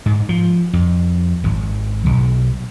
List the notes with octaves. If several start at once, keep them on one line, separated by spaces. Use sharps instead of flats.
G#2
F3
F2
G#1
B1